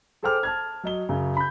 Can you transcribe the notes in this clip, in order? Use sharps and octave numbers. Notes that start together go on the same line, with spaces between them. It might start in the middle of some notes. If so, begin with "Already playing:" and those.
G#4 A4 C5 G5 D6 F6
A5 F6 G#6
F#3 D#5 G7
F#2 C#3
B5 G6